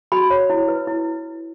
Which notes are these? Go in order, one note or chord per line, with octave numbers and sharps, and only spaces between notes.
F#4 B5
C#5
E4
B4
E4